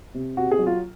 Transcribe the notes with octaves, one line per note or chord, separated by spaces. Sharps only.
C3
C3 F#4
G#4
F#3
F4